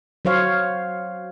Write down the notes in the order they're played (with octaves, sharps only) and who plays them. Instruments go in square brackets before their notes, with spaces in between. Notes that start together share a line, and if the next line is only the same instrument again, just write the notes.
[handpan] F#3 C5 C#5 F5